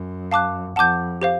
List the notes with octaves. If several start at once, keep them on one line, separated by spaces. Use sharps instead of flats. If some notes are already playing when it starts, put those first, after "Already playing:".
Already playing: F#2
F5 A5 D6 F#6
F2 F#5 A5 D6 G6
G4 C5 F5